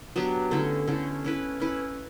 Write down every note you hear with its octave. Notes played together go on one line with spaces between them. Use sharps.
F#3 B3 D4 G4
D3 A3 C#4 E4
D3 A3 C#4 E4
C#4 E4 B4
C#4 E4 B4